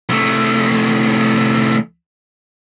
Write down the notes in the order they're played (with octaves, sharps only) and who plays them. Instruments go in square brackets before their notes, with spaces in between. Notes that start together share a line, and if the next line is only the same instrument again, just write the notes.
[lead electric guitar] C2 A3